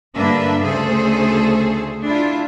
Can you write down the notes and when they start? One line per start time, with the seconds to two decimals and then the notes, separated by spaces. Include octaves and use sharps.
0.16 G2 D3 A#3 D4 B4 E5
0.63 D2 C#3 A3 G#4 A4 C5
2.04 D4 E4 F4